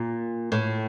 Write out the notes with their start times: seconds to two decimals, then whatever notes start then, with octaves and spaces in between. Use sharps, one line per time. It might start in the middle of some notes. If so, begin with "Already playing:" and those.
Already playing: A#2
0.52 A2